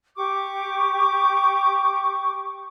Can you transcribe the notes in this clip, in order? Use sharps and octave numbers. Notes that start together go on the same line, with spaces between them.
G4 C#6 D6